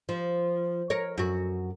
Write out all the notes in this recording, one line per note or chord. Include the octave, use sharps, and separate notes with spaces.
F3
A#4 C#5
F#2 F#4